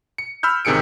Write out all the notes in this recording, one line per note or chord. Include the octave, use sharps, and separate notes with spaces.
C#7
B5 E6 F6 G6
A1 C3 D#3 G#4 C#7 D7